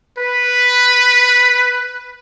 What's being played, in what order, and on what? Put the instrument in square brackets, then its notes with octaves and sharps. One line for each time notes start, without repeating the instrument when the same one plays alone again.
[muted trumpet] B4